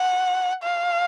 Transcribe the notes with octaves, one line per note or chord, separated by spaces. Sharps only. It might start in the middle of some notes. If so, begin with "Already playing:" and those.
Already playing: F#5
F5